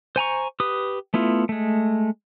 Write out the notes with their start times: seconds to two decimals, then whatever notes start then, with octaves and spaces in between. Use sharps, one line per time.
0.16 C5 G#5 A#5 C#6
0.60 G4 B4 D#6
1.14 A3 B3 E4 F4
1.49 G#3 A3